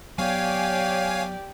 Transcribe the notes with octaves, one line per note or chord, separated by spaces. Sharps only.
F#3 B3 G4 C#5 D5 F5 G#5